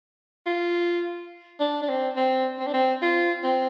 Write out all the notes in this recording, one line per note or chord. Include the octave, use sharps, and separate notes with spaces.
F4
D4
D4
C4
C4
C4
D4
C4
F4
C4